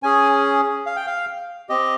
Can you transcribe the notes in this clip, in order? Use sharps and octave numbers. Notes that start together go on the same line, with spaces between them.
C#4 G#4 G#5
F5
G5
F5
C4 G4 D#5